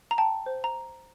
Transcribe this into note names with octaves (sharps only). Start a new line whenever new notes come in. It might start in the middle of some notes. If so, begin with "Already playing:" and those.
A#5
G5 A5
C5
A#5